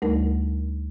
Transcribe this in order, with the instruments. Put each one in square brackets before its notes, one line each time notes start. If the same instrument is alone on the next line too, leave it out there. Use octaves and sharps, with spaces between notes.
[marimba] D2 G3 A3 D#4 A#4